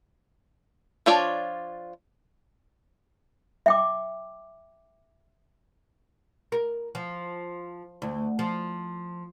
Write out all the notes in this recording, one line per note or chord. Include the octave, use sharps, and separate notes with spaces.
F3 D4 F4 C#5 D5
E5 G5 D6
A#4
F3
D2
F3